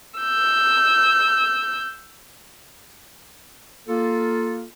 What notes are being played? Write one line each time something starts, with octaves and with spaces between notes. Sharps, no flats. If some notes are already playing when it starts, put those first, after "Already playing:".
E6 G6
A#3 F4 A4